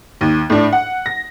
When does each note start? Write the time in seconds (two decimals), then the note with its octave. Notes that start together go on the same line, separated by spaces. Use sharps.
0.21 D#2
0.50 A2 D4
0.73 F#5
1.06 A#6